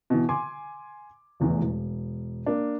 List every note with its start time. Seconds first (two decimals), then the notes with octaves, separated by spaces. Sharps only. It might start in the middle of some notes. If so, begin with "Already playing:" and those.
0.10 B2 E3
0.29 G#5 C6 D6
1.40 F1 E2 A2 E3
1.61 E1
2.46 A#3 D4